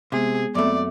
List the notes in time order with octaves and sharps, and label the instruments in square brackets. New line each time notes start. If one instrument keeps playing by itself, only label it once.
[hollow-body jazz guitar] C3 [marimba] G#3 B3 [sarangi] G#4
[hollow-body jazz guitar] F#2 A3 [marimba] B3 C4 B5 [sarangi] D5